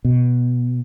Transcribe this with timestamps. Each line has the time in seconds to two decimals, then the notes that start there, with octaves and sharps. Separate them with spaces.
0.05 B2